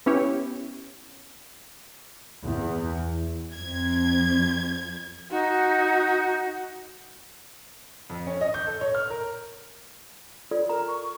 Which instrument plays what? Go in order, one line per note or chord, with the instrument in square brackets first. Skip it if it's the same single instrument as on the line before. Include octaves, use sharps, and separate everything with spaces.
[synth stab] B3 C#4 E4 G4 C#5
[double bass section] E2
[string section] F2 G#6
[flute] D#4 [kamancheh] F#4
[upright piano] F2
C#4
D#5
G6
A4
C#5
F6
A#4
[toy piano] F4 A4 D5
[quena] A#4 [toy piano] A#5
[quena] C#6